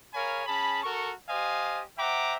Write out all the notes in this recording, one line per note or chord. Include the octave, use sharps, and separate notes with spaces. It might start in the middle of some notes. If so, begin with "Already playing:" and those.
G#4 A#4 C#5 F5 G#5 B5
C#4 G#4 A5 B5
F#4 A4 A#4 C#6
G4 C5 D#5 F5 G#5 D#6
C5 E5 F#5 G5 A#5 D6